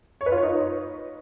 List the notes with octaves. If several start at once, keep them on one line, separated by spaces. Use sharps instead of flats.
C#5
B4
F4
C#5
D#4